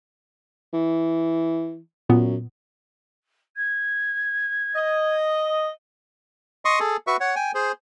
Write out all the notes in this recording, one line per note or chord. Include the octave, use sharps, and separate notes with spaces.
E3
F#2 A#2 B3
G#6
D#5
D#5 C6 C#6 D#6
G#4 A4
F#4 B4 E5 C#6
C#5 F#5
G5 G#5
G#4 C5